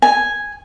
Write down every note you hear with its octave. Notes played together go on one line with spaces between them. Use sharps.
G#5